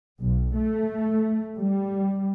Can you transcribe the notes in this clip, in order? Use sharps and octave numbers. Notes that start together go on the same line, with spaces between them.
B1
A3
G3